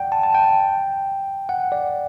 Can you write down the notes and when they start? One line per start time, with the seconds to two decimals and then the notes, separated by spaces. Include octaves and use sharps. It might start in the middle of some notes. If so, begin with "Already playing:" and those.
Already playing: D5 F#5 G5
0.12 A5
0.23 A5
0.34 G5
1.49 F#5
1.72 D5